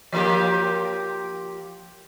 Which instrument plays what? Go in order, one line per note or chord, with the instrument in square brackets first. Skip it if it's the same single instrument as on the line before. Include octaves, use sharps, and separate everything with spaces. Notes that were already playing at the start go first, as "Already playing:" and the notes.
[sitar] F3 A#3 G4